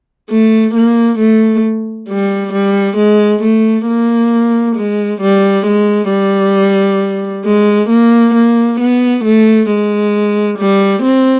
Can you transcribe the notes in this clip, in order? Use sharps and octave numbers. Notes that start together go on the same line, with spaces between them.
A3
A#3
A3
G3
G3
G#3
A3
A#3
G#3
G3
G#3
G3
G#3
A#3
A#3
B3
A3
G#3
G3
C4